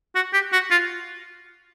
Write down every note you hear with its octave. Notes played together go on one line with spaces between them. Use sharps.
F#4
G4
F#4
F4